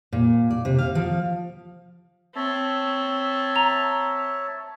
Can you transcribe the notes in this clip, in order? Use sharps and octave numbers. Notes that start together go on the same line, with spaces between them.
A#2
D5
C3
F5
F3
C4 C#5 E5 A5
A#5 F7